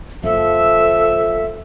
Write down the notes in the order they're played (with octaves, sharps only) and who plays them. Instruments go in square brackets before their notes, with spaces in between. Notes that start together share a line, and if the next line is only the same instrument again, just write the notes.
[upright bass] F#1 [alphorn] F3 [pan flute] A4 [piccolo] E5